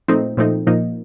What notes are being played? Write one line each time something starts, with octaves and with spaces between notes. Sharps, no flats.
A#2 F3 A3 C4 D#4
A#2 F3 A3 C4 D#4
A#2 F3 A#3 D#4